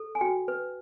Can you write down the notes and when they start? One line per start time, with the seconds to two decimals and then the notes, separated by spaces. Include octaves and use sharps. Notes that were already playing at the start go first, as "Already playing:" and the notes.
Already playing: A4
0.15 G#5
0.21 F#4 G5
0.48 B4